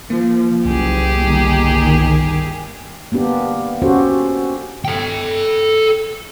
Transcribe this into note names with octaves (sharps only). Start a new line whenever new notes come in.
F3 A#3
F#1 C2 G4 G#4
G1 D#3
A#3 B3 D4 G4
C#4 F#4 G4 A4 C5
A4 G5